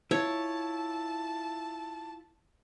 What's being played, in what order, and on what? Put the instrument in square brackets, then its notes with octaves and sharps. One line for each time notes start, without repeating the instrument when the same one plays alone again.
[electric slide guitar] E4 F4 [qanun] C#5 [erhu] A5